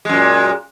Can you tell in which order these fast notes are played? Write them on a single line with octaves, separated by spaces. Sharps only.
G#3 F#2 A#2